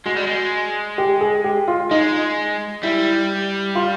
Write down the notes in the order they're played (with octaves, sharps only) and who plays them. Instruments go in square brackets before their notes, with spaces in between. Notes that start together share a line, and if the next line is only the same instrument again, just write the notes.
[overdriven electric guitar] G#3 [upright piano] F#4
[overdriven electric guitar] G3
G#3
[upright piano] G4
G#4
G4
F4
[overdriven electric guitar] G#3 [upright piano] D#4
[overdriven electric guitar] G3 [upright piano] E4
[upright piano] F4